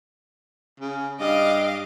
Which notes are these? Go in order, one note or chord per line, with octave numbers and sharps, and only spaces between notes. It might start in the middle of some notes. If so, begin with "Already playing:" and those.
C#3
G2 D#5 F5 D6